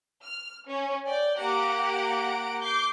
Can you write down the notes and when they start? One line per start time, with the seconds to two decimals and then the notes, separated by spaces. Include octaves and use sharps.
0.23 F6
0.68 C#4
1.05 D5 G5
1.38 A#3 G4 F#5 A#5 D7
2.61 D6 G6 C7